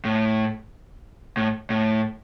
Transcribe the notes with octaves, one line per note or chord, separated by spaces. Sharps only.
A2
A2
A2